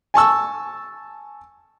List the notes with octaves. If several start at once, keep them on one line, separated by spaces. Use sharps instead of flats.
G#5 A5 C#6 E6